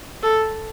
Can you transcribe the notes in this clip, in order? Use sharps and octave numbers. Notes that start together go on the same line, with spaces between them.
A4